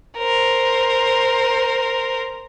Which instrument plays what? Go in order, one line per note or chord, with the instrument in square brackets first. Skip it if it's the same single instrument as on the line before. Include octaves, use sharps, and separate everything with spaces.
[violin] A#4 C5